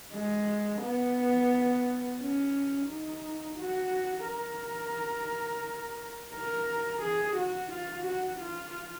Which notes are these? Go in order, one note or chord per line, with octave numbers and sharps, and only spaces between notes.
G#3
B3
C#4
D#4
F#4
A#4
A#4
G#4
F#4
F4
F#4
F4